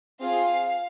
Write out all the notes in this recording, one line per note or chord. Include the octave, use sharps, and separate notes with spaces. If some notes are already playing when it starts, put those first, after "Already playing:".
C4 F4 G#4 F5